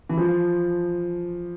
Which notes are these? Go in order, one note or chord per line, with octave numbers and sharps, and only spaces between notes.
E3
F3